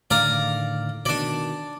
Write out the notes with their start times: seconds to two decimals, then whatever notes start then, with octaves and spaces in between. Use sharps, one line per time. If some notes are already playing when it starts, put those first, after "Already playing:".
0.11 A2 D3 D#3 D5 F5 A#5
1.06 B2 D#3 D4 D5